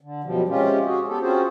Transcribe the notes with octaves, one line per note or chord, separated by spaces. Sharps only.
D3
F#2 B2 F3 G3
C3 G#3 C#4 F4 G4
F#4 G#4
B3 G4 A4
C4 C#4 F4 F#4 G#4 C5